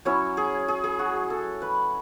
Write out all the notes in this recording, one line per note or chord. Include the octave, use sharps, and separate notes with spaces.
F#3 C#4 E4 C#5
G#4
G#4
G#4
F#4
A4
B4